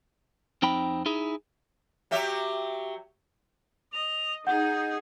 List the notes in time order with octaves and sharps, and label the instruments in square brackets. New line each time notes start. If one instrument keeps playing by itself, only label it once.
[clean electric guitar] F2 C4 D#4 G5 B5
D#4 E4 G#4
[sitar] F#3 G4 E5
[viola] D#5 [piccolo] F7
[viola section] D#4 [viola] G#4 [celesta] F#5 [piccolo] G6